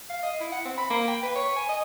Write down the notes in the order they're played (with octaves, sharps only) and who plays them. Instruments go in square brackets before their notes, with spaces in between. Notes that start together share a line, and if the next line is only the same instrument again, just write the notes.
[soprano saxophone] F5
D#5
E4
F#5
C4
B5
A#3
G5
B4
C#5
G#5
D#5